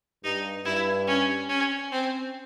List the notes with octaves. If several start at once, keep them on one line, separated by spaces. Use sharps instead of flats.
G2 D#4
G2 E4
C#4
C#4
C4